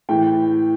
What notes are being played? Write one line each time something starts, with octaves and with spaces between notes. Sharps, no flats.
A2 E3 G5